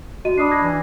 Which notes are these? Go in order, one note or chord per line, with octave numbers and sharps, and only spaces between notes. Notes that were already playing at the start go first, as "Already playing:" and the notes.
F#4 D#5 D#7
D4 B5 D#6 C7
G#6 A#6
E3